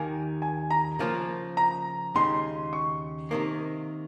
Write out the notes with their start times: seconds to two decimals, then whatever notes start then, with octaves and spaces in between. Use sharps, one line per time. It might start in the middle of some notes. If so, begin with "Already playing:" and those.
Already playing: D#2 D#3 A#3 G#5
0.42 G#5
0.70 A#5
0.99 C#3 F3 A#3 F4
1.57 A#5
2.15 D#2 C#3 G#3 D#4 C6
2.73 C#6
3.31 C3 D#3 A#3